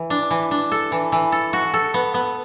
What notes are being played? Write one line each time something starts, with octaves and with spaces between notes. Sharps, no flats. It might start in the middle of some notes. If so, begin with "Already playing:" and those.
Already playing: E3
D4
E3
D4
A4
E3
E3
A4
F#4
A4
B3
B3